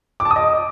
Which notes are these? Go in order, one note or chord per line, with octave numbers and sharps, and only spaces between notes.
D6
A5
D#6
D#5